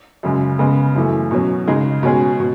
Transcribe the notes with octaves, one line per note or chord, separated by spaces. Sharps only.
F#2 C#3 G#3
C#3 G#3 B3
F#2 E3 A3
B2 F#3 C#4
C#3 G#3 D#4 G#4
B2 G#3 C#4 G#4
B2